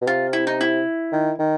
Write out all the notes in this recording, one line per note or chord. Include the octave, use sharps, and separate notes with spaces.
B2
C3 F4
E4
D#4
E4
D#3
D#3